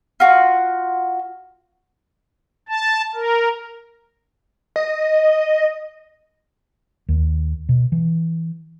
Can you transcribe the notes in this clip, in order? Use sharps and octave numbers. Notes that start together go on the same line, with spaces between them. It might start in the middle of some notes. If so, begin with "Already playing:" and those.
F4 F#4
A5
A#4
D#5
D#2
B2
E3